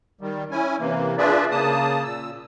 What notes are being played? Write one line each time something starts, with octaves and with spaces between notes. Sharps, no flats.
D#3 G3
C#4 E4 G#5
C3 E3 A#3
D4 F4 G#4 B4 D5 E5
C#3 A#3 A5 D#6
A#2 E6